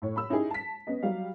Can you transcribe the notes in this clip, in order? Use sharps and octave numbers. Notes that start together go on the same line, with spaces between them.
A2 C#5
B5 E6
C#4 D#4 E4 G4 G#4
A5 B6
B3 C#4 D#5
F#3 G3 F5